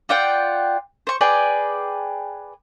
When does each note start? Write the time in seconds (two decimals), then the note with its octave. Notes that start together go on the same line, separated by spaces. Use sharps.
0.09 F4 D5 F#5 G5
1.07 C5 C#6
1.21 G#4 B4 D5 G5